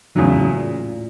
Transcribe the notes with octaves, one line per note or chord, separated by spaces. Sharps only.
E2 A2 C#3 F#3
A#2
A#2
A#2